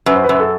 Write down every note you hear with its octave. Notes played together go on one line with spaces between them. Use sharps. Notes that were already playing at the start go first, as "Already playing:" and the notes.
F#2 B4
C5
B4
F#2
B4
A4